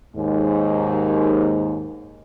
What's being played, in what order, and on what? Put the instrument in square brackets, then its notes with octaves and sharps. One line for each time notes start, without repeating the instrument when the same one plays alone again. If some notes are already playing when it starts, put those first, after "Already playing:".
[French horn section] D#2 G#2